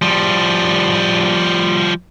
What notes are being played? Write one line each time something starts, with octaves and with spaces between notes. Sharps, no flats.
F3 G3